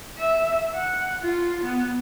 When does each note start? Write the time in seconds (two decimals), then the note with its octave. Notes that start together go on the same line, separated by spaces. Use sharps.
0.18 E5
0.75 F#5
1.22 F4
1.63 B3